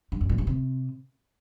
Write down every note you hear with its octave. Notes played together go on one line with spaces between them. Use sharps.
G2
F#2
A#2
G2
C3